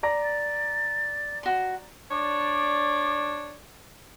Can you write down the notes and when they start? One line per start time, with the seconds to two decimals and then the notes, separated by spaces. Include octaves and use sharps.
0.03 D5 A#5 A#6
0.23 A6
1.43 F#4 C6
2.11 D4 C#5 D5